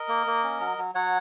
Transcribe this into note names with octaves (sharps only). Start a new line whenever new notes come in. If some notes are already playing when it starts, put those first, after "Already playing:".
Already playing: A#4 D#5
A#3
A#3
C#4
F#3
F#3
F#3 C#5 F#5